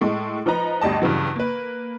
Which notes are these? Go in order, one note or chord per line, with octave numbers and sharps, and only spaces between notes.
A2 G#3 A3
F3 D#4 B4 A#5
G1 D2 G3 D#5 A5
G2 C#3 E3 F#3
A#3 B4